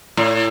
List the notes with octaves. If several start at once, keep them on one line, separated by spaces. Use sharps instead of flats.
A2